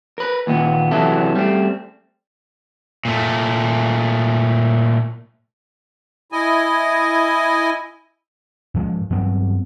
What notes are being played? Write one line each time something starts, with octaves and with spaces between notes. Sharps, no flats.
A#4 B4
D#2 A#2 B3
C3 E3 F#3 B3 E4 A4
G3 A3 C4
A#2 A3
E4 D#5 G#5
G#2 F3 G3 G#3
G2 F#3 B3 C4